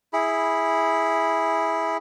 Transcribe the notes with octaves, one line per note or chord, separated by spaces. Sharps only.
E4 G#4 B5